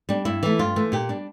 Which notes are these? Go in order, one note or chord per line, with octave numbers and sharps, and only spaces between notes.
G3 D4
G2 E4
E3 A3
G2 F4
E3 A3
A#2 G4
G3 D4